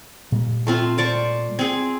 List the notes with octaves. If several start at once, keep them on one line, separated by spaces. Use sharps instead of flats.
A#2 G3 G#3
A3 C4 F4
C5 D5 C#6
C4 G#4